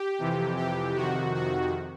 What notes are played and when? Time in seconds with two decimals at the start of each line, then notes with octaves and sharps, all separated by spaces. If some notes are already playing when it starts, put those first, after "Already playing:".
Already playing: G4
0.18 F2 C3 E3
0.57 G4
0.95 F2 C3 D#3 F#4
1.35 F#4